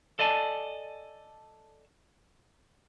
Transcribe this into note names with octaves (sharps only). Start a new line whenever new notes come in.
A4 D5 D#5 G#5 A5